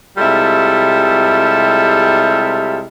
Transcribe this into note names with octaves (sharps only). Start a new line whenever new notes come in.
C3 G3 G#3 E4 F4 A4